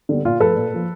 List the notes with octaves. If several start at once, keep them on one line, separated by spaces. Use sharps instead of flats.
D3 G3 B3
A#2 F4
F3 A3 A4 B4
A#2
F3 A#3